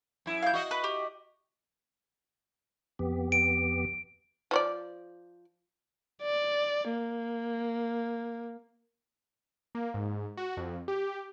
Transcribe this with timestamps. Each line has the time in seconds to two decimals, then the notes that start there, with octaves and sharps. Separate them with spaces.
0.26 F#2 E4
0.42 F5 G6
0.54 F#4 D#5
0.71 B4
0.84 G4
2.99 F2 B3 G4
3.32 D7
4.51 F3 C#5 D5
6.22 D5
6.90 A#3
9.75 A#3
9.94 G#2
10.37 F#4
10.57 F2
10.88 G4